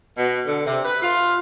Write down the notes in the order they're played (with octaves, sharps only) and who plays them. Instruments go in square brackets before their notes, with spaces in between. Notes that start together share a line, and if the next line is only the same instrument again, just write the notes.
[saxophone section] B2
D3
C3
B4
F4